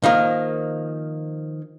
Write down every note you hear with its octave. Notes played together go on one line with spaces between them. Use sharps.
D#3 F3 A#3